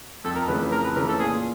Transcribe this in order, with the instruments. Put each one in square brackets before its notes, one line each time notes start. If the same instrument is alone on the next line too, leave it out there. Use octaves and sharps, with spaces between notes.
[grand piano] F2 [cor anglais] A4
[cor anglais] A#4
[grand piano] C#3 E3 A3 [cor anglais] B4
[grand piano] F2 [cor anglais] A#4
[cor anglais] B4
[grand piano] C#3 E3 A3 [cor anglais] A#4
[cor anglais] A4
[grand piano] A#2 [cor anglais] G#4